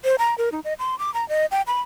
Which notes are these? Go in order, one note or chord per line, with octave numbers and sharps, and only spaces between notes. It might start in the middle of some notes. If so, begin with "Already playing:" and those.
C5
A#5
A#4
D#4
D#5
C6
D6
A#5
D#5
G5
B5